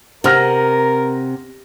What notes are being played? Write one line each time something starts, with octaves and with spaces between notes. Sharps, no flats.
C3 A#4 F#5 F6 A#6